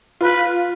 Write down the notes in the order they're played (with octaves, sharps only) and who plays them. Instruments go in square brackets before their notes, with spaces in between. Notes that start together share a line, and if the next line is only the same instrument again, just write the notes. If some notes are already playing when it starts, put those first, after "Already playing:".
[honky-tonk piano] F4 [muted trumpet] B4